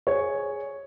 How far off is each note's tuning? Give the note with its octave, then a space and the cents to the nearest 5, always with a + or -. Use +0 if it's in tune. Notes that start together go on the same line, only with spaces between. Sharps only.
G#4 +0 C#5 +0